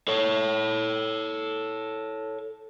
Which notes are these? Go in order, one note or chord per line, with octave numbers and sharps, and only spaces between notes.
A4 C#5